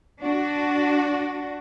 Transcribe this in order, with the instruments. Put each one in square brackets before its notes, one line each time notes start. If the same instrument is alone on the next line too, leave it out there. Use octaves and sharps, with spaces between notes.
[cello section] D4 F#4